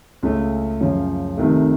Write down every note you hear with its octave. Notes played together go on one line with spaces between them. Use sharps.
C#2 C#3 A3
F#2 C#3 F3
F1 F2 C3 D#3 A3